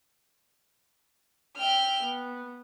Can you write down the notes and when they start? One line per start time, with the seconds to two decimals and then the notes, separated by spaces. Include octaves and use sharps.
1.57 E5 G5 F6
2.02 B3